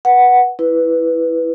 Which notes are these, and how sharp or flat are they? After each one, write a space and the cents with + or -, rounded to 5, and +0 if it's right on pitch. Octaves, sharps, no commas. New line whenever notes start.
B4 -15 F#5 +0
E4 +0 B4 +0